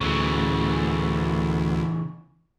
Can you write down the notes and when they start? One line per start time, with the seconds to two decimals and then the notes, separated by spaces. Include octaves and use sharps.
0.01 D2 C#3 E3